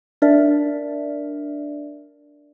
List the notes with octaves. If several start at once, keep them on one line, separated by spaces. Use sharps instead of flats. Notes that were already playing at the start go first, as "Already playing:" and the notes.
D4 A#4 D5 E5